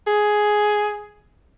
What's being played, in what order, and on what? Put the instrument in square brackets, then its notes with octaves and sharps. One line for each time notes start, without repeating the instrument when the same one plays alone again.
[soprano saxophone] G#4